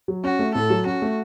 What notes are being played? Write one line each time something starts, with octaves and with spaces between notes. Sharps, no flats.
F#3
C#4 F#4
A3
A2 A4
F#3
C#4 F#4
A3